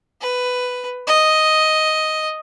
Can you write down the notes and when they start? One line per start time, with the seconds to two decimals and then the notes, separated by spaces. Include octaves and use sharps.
0.21 B4
1.07 D#5